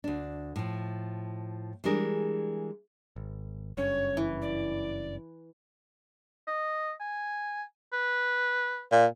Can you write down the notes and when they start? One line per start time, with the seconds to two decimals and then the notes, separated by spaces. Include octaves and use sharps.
0.04 D2 D4
0.56 A2 F3
1.84 E3 G3 G#3 D4 G#4 A#4
3.16 G#1
3.77 F#1 G2 C#4 C#5
4.17 E3
4.42 D5
6.47 D#5
7.01 G#5
7.93 B4
8.92 A#2